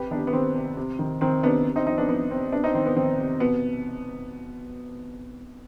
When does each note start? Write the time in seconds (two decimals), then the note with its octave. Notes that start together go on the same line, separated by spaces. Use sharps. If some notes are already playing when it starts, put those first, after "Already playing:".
Already playing: C3 G4 B4
0.11 D#3 B3 D4
0.27 B3
0.33 D#3 C4
0.55 C3
0.77 C3
0.99 D#3
1.21 D#3 C4
1.43 C3 B3 D4
1.65 C3
1.76 C4 D#4
1.87 F3 C4 D#4
1.98 B3 D4
2.09 F3 B3
2.31 C3 C4
2.52 C3 B3 D4
2.64 C4 D#4
2.75 D#3 C4
2.86 B3
2.96 D#3 C4
3.18 C3
3.40 B2 B3